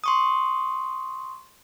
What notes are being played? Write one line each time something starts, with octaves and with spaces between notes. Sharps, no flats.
C6 C#6 D#6